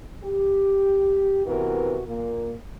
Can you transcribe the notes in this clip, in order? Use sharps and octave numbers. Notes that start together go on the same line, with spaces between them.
G4
C3 E3 B3 F#4 A#4
A#2 A#3